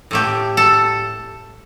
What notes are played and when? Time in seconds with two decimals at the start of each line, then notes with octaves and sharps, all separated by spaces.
0.11 A2 A3 G4
0.57 A4